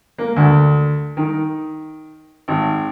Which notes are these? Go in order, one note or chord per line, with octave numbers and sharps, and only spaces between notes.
A#3
D2
D#3
G#1